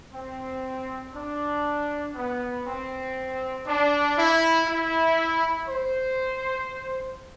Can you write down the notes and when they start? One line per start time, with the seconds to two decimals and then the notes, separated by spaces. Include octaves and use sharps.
0.13 C4
1.13 D4
2.14 B3
2.65 C4
3.66 D4
4.16 E4
4.67 E4
5.68 C5